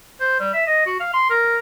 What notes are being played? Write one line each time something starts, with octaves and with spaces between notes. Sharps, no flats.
C5
G3
E5
D#5
F#4
F5
C6
A#4